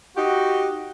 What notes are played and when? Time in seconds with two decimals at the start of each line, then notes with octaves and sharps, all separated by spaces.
0.16 D#4 F#4 G4